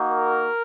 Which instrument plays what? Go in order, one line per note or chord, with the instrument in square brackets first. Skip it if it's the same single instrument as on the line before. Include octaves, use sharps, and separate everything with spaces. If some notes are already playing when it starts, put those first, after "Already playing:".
Already playing: [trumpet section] A#3 D#4 F#4
A#4